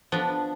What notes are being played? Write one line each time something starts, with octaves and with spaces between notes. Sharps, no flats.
F3 B3 D4